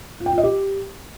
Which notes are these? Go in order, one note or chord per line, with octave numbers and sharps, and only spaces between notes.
F4
G5
F4
D#5
G4